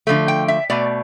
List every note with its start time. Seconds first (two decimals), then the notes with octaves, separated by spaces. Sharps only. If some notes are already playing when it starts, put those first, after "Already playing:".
0.07 D3 F3 A3
0.28 G5
0.48 E5
0.70 B2 A3 D5